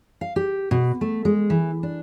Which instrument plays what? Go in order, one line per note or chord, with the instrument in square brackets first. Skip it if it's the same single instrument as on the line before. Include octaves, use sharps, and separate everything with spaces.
[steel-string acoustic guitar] F5
G4
B2
A3
G#3
E3
D4